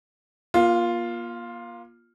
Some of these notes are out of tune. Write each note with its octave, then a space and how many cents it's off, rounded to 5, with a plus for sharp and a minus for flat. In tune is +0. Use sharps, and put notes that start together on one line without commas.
A#3 +35 F4 +0